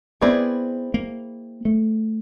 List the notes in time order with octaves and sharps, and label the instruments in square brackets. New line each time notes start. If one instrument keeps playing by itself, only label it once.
[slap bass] B3 [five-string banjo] C4 E4 G#4 B4 D5
[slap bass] A#3
A3